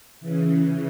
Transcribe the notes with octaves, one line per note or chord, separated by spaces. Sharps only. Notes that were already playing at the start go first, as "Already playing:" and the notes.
C#3 E3